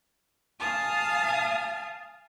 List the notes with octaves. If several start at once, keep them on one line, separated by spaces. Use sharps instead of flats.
F5 G#5 A5 D#6 F6